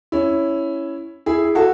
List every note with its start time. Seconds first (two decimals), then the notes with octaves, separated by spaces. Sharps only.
0.12 C#4 E4
1.26 E4 G#4
1.55 F#4 A4